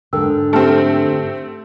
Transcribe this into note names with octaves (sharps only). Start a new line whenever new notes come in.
G#2 D3 A#4 G5 E6
A3 C4 G4 A5 F6